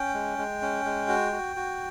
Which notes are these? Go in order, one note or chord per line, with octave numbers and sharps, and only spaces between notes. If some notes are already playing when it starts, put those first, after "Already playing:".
Already playing: C#4 G5
G#3
G#3
C#4
G#3
F#4
F#4
F#4